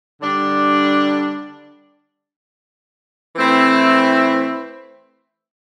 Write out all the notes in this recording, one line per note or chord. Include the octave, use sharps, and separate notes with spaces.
D3 G3 D4
E3 A3 C4 E4